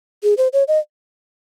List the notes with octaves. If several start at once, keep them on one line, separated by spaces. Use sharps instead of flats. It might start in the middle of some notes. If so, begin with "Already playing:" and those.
G#4
C5
C#5
D#5